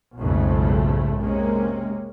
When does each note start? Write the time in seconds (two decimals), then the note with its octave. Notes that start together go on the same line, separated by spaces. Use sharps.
0.17 B1 F2 G#2 C#3 A3
1.18 C3 G#3 A#3 C#4